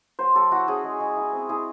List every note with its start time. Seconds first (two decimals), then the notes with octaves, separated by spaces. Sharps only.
0.19 F#3 C5
0.35 F#3 A4
0.52 E4 F#4
0.68 C#4 G#4
0.84 G#3
1.00 G#3
1.17 E4
1.33 C4
1.49 E4 G#4